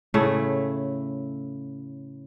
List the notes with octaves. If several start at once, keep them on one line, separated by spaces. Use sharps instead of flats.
A2 C#3 A3 E4